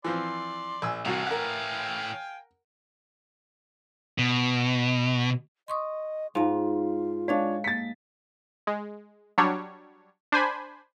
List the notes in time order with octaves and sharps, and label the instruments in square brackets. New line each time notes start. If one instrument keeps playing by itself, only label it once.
[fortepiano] E3 F3 C4 [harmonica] D5 C6
[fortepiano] A#1 G#5 E6
[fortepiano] C2 F#4 [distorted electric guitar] A2 E3 [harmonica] F5 G5 G#5
[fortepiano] A#4 F#5
[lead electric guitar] B2
[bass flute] D#5 [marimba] C6 C#6 D#6
[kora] G#2 [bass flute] F4 [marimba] F5 A5
[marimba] G#3 D#5 F5 [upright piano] D4 C#5
[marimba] A#3 [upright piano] A6 B6
[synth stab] G#3
F#3 G3 D4 C#5
D4 C5 G#5 B5